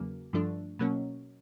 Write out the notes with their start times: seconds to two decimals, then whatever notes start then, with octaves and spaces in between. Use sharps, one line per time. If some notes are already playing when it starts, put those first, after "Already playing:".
Already playing: E2 C#3 F#3 A#3
0.33 G2 D3 F3 A3 D4
0.79 B2 F#3 A#3 C#4